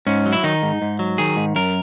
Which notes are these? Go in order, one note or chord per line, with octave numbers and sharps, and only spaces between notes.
G#2 C#4
F#3
E4
D#3 D#4
G#2
G#2
F#3
D#3 G#4
G#2
F#2 A#4